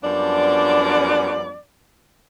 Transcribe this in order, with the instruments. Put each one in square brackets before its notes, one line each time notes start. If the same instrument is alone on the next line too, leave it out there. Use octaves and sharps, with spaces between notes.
[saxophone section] F#2 F3 G3 B3 D4 D5